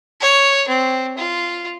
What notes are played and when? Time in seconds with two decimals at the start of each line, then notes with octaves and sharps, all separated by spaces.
0.21 C#5
0.68 C4
1.17 F4